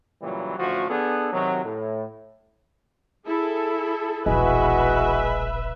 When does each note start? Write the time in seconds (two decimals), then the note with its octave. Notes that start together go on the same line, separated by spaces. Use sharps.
0.22 A#2 C#3 E3 F#3 G3
0.59 A1 D2 F3 F#4
0.90 B3 D4 G#4 A4
1.33 C3 D#3 F#3
1.65 A2
3.25 E4 G#4 A4
4.26 E1 A#1 E2 G#3 B3 F#4 B4 E5